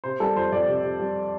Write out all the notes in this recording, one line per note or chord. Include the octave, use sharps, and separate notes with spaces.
C3 C5
G3 A4
F2 C5
F2 D5
C3
C3
G3